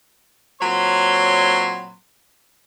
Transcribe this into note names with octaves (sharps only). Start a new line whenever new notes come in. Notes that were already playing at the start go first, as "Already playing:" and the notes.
A#2 F#3 C4 C#5 B5 C6